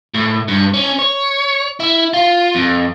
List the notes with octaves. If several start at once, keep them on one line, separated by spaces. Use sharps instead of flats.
A2
G2
C#4
C#5
E4
F4
F2